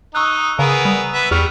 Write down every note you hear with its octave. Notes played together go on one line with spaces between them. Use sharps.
D#4 C#6 E6 F#6
C#3 B3 G#4 A#4
G3
B3 B4 E5
E2 G3 C#6 F6